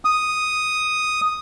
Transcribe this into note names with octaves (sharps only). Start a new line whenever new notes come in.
D#6